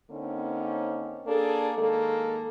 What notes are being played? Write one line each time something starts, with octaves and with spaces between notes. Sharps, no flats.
D3 A#3 C4 C#4 D#4
A#3 D4 G#4 A4
D#3 G#3 A#3 A4